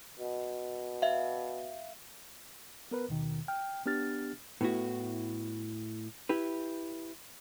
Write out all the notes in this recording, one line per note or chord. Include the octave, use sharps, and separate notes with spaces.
B2
E5 F5
B3 A#4 B4
D#2 B2 D#3
G5 F6
B3 D4 G4 F6 A6
A2 B3 E4 F#4
E4 G4 B4